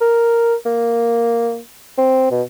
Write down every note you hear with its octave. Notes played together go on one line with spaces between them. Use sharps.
A#4
A#3
C4
B2